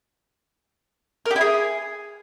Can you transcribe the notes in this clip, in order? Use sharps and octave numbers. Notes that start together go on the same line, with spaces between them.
A#4
G4
E4
G#4